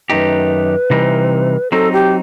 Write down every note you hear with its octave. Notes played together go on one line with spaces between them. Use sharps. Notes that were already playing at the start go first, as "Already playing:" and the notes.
F#2 D#3 A3 D#4 G4 B4
C3 E3 G3 C4 D#4
F#3 C4 D#4 A4
G4